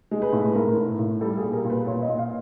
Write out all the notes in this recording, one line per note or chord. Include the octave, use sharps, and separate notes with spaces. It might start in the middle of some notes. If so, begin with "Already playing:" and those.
G#3
B4
A2
A2 A#4
A2
A2
G3 A4
G#4
A#2
A#4
A#2
B4
A#2 C#5
D#5
A#2
F5